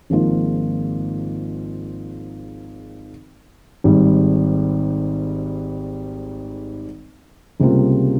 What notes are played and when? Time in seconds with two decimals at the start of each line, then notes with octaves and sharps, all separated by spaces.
0.10 G#1 G#2 F3 A#3 F4
3.84 G#1 G#2 G3
7.60 C#2 C3 G3 A#3 F4